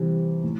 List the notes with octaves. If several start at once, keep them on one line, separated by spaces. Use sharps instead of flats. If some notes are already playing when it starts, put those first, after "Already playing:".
Already playing: C3 E3 G3
A2